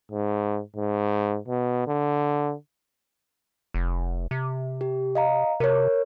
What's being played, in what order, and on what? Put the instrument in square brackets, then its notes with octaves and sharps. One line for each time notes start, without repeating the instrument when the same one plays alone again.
[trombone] G#2
G#2
B2
D3
[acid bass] F1
C3
[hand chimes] G4
D#5 F5 A#5
[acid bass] C3 [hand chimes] A#4 C#5